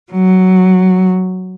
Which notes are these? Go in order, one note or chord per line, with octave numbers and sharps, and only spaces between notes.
F#3